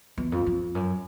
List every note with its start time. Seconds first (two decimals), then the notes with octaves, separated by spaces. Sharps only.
0.18 E2
0.32 F2
0.46 F2
0.75 F#2